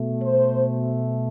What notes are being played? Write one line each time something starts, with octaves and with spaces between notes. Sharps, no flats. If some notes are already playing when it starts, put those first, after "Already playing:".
Already playing: B2 A3
C5